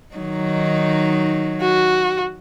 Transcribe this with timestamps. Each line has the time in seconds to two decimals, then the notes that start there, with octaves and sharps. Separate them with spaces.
0.15 D#3 F#3 D#4
1.61 F#4